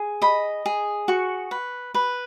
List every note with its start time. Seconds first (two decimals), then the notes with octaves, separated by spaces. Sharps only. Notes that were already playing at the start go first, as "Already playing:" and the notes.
Already playing: G#4
0.22 D#5 B5
0.66 G#4
1.08 F#4 C#6
1.51 B4
1.94 B4